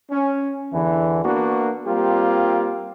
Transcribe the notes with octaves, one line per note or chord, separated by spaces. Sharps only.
C#4
E2 D3 E3
A#3 B3 D4 F#4
G3 A#3 C4 F4 G4